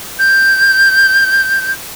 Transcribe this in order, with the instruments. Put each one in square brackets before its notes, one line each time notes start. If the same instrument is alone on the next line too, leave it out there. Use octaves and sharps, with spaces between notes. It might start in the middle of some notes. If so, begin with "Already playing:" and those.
[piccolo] G6